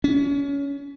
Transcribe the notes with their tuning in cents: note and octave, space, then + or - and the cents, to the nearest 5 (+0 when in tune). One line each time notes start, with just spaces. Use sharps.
C#4 +25